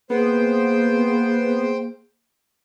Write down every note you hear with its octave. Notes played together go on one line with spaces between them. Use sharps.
A#3 B3 G#4 C5 G5